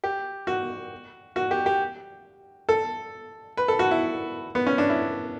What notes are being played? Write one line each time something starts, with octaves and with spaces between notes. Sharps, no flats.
G4
F#4
F#4
G4
G4
A4
B4
A4
F#4
E4
B3
C#4
D4
E4